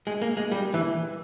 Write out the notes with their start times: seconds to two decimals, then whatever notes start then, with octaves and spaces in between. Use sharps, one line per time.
0.07 G#3
0.22 A#3
0.37 G#3
0.52 G3
0.74 E3